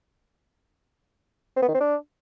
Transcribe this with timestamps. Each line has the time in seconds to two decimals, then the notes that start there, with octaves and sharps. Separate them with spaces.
1.56 C4
1.62 B3
1.68 D#3
1.74 C4
1.80 D4